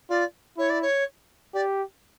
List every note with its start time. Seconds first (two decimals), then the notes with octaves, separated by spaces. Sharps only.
0.10 F4 D5
0.57 E4 C#5
0.69 D5
0.82 C#5
1.54 G4 D5